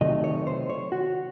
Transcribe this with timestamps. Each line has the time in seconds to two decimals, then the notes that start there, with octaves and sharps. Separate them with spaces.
0.01 C3 D#3 F#3 A3 D#5
0.24 C#5
0.47 C5
0.69 C#5
0.92 F#4